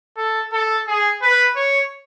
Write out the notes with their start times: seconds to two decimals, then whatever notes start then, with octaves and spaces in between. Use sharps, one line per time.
0.17 A4
0.52 A4
0.87 G#4
1.22 B4
1.56 C#5